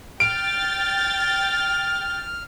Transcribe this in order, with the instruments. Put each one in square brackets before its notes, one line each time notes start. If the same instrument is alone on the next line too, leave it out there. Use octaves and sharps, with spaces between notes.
[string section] G5 A6 [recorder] F6 [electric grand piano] D7